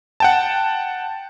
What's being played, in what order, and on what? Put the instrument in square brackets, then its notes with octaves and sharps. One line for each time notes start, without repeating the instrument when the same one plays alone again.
[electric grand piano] F#5 G5 A5